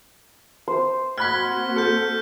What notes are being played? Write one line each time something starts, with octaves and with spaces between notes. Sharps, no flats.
C5
A#3 C4 F#4 B5 F6 F#6 G#6 B6
A4 F6 G6